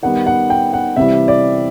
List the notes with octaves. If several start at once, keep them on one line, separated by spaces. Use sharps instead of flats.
D#3 G3 B3 F#5
F#5
G5
F#5
C3 E3 G3 E5
D5